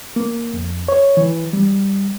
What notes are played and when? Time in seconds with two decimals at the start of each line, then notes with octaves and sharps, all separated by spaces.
0.16 A#3
0.54 F2
0.88 C#5
1.17 E3
1.53 G3